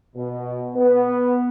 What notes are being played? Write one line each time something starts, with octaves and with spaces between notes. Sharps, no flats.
B2
B3